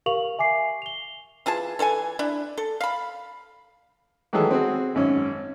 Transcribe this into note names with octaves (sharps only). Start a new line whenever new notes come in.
G4 A#4 F5 C#6 F7 F#7
E5 G#5 D6 C7
F7 G7
E3 F4 G#4 A5
E3 A4 F#5 G#5
D4 E4
A4
F5 B5
D#3 E3 F#3 G#3 G#4 A4
C4 F#4 G#4
G#1 F#2 C#4